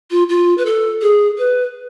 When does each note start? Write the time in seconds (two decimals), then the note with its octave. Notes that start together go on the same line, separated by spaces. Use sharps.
0.11 F4
0.29 F4
0.58 B4
0.66 A4
1.02 G#4
1.38 B4